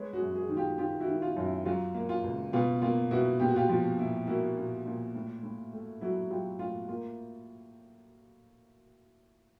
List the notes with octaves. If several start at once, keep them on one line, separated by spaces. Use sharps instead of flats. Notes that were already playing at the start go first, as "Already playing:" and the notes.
Already playing: G#3 B4 C#5
F#4 G#4
F#2
F#4 G#4
D#3
F4 G4
D#3 F4 G4
E4 F#4
D#3
F4
F#2
E4
F#3 F4
A#3
F4
C#2
B2 F4
A#3 F4
B2 E4 F#4
A#2 G4
F#4
F4 G4
F3 F4
A#2 E4
A#3 E4 F#4
A#2
A#2
A2
A2
A3
F#3 E4 F#4
F#3 F4 G4
A2 F4
A#3 F4